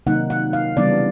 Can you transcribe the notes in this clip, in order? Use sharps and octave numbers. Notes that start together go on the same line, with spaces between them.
C3 D#3 F#3 A#3 D#4 F#5
F#5
F5
C#3 E3 G3 B3 D4 D5